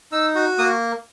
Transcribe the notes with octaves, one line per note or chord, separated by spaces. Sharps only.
D#4 E6
F#4
A#3 D#6